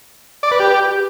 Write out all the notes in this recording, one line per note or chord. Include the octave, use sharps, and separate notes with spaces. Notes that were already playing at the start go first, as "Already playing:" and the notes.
D5
B4
G4